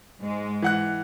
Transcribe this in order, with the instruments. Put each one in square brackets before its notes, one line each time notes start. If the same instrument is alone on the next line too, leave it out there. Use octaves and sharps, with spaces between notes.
[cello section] G#2 G#3
[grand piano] E3 F#5 F#6